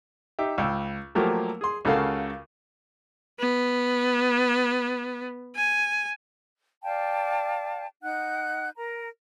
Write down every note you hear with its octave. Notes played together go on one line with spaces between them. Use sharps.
D#4 G4 E5
C#2 G5 E6
F3 F#3 A3 A#3 G4 A#4
G#4 C6
C#2 C#3 F#4 A4 A#4 F5
B3
G#5
D5 F5 G5 A5
D#4 F#5 F#6 G6
A#4 A#5